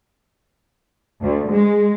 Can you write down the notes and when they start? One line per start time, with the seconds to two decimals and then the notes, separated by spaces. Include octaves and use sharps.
1.22 D2
1.51 G#3